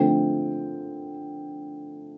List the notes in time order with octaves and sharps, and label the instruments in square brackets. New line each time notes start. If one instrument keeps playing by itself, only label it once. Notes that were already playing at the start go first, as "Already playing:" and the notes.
Already playing: [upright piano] D3 F3 A3 C4 G5